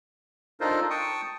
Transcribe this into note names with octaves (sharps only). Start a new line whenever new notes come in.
D4 D#4 F4 A4 A#4 C5
G5 A5 C#6 D#6